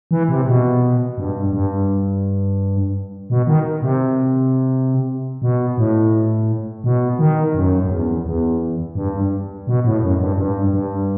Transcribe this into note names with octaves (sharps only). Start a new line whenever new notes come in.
E3
C3
B2
G2
G2
B2
D#3
C3
B2
A2
B2
D#3
F#2
F#2
E2
E2
G2
B2
A2
F#2
G2
G2
G2